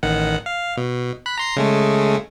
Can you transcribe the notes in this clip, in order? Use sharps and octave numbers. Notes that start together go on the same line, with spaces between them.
A1 D#3 F#5
F5
B2
B5 F#6
A#5 C6 C7
C#3 G#3 A3